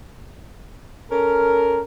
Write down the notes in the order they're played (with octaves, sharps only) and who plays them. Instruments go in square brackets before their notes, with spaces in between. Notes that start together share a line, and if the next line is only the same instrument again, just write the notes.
[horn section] C#4 A4 A#4